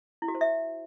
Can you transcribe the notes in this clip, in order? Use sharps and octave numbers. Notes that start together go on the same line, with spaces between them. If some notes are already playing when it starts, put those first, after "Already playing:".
E4
F#4
C5
E5